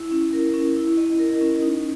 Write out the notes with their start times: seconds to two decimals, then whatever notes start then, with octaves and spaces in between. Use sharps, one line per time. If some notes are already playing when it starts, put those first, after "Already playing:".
Already playing: E4
0.11 C#4
0.33 A#4
0.54 C#4
0.77 E4
0.97 D#5
1.19 A#4
1.41 C#4
1.62 D#4